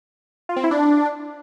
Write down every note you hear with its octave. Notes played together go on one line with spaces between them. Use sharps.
F4
C4
E4
D4